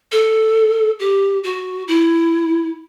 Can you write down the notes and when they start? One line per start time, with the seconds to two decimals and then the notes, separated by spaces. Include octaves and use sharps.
0.12 A4
0.99 G4
1.44 F#4
1.88 E4